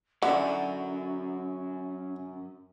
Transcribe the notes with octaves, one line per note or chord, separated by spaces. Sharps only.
F#2 D3 C#4 E4 F#5